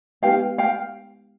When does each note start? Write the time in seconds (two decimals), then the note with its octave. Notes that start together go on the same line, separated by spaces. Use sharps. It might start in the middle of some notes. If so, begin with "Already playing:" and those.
0.22 G#3 B3 D#4 G4 B4 F5 G5
0.58 F5 G5